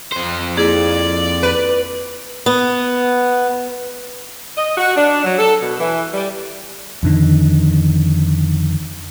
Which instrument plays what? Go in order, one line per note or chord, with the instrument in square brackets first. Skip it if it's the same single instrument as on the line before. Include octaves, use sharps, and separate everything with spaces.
[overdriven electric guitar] F2 C5
[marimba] A#3 E4 G#4 [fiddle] D5
[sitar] B4
[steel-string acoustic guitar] B3
[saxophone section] D#5
F#4
D4
F#3
A4
B2
E3
G3
[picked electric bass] F2 D3 D#3